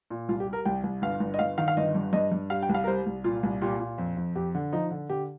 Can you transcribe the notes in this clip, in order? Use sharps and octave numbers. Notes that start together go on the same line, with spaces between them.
A#2
C2 F4
G4
G3
A#4
C2 G5
C2
G1 F5
G1
D#5
G1 F5
D#3 F5
F5
G1 D#5
G2
G2 D#5
G2
G3 F5
G5
C2
F5
A#4
G3 C5
C2
A#2 F4
C2
A#2 G4
A#2
F2
F2
F2 G4
D3
F3 D#4
D3
D3 G4